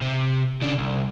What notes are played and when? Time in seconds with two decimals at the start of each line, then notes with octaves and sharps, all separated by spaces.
0.02 C3
0.62 C#3 D4
0.78 C2